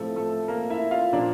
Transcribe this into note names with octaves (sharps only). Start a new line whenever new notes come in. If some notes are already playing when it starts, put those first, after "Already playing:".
Already playing: A2 F3 A3 C4 A4
A3 A4
A#3 A#4
E4 E5
F4 F5
A#2 F3 A#3 D4 D5